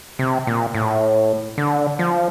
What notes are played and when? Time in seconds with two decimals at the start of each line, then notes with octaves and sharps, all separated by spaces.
0.19 C3
0.47 A#2
0.74 A2
1.58 D3
1.99 F3